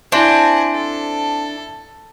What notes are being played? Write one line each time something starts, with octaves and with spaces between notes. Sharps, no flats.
C4 D4 E4 C5 F#5 G#5 A5
A4